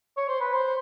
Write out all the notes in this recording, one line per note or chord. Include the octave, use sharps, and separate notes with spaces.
C#5
C5
B4
C5